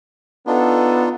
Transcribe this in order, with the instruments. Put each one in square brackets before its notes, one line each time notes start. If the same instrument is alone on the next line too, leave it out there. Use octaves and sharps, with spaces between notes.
[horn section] B3 A4 [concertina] D4 D#4 F4